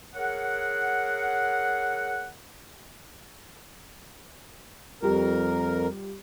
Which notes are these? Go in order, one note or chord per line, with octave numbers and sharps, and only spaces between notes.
G#4 A#4 C#5 F#5
F2 G3 F4 G4 A#4